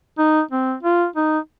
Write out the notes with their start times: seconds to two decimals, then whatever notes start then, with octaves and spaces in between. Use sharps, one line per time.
0.18 D#4
0.51 C4
0.83 F4
1.16 D#4